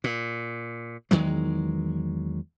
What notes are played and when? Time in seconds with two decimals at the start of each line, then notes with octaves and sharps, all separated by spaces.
0.04 A#2
1.11 E2 D#3 F#3 G#3